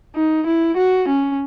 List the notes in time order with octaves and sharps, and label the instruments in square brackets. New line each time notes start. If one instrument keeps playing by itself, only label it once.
[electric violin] D#4
E4
F#4
C#4